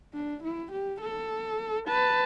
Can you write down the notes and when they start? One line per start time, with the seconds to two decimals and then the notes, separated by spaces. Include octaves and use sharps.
0.15 D4
0.43 E4
0.72 G4
1.01 A4
1.87 B4 A5